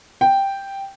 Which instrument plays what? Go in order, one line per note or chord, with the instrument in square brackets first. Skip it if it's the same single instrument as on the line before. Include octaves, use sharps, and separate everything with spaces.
[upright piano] G5